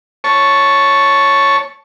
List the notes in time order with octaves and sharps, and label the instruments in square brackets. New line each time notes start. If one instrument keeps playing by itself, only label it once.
[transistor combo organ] C#5 A5 C#6